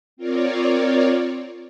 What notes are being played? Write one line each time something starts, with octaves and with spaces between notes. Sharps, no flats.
C4 F4 A#4 C#5 D5